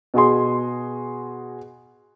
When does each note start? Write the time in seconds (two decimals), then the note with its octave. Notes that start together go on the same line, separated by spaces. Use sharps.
0.14 B2 F#4 G#4 C6